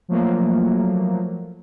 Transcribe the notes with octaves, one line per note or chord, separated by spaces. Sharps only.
F3 F#3 A3 A#3